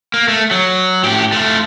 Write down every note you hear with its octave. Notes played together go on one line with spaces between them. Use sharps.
A#3
A3
F#3
A2 G4
A3 F4